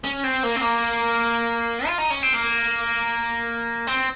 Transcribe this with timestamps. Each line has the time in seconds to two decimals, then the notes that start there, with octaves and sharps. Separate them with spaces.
0.04 C#4
0.24 C4
0.43 A#3
0.56 C4
0.62 A#3
1.87 F4
1.98 D#4
2.10 C#4
2.23 C4
2.34 A#3
3.87 C4